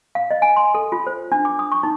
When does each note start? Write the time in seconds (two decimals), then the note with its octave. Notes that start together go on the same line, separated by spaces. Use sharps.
0.15 F5
0.31 D#5
0.42 G#5
0.56 C6
0.75 A4
0.92 F4
1.07 C5
1.32 D4
1.45 D6
1.59 D#6
1.72 C#6
1.83 D#4